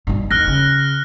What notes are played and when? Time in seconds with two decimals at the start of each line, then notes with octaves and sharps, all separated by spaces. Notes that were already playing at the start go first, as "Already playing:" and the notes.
0.07 B1 G2
0.31 D#2 F6 F#6 A#6
0.47 C#3